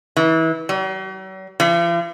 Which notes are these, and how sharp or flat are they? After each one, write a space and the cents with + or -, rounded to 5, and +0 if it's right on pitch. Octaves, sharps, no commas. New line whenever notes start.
E3 -30
F#3 +45
F3 -45